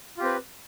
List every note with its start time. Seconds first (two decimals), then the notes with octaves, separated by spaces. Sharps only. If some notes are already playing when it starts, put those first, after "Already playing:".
0.17 F4
0.20 G4
0.23 C4
0.25 B4